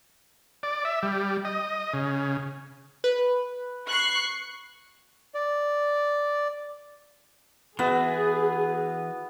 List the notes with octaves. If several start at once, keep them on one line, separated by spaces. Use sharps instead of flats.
D5
E5
G3
D#5
C#3
B4
C#6 F#6 C7
D5
E3 B3 F#4 G#4 E5